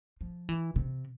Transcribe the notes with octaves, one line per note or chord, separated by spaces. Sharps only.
F3
E3
C3